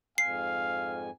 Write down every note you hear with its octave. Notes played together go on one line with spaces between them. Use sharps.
F2 G#2 F5 G#5 C7